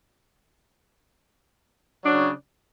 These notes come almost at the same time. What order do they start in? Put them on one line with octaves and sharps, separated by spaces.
F#3 D4 C#3